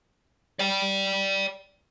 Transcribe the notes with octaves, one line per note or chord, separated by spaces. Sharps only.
D5 G5